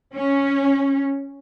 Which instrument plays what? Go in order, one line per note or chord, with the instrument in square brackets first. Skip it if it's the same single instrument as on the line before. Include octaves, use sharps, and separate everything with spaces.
[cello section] C#4